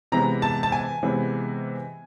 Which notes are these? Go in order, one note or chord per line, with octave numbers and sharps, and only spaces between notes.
C3 E3 G#3 B3 A#5
A5
A5
G#5
C3 E3 G#3 B3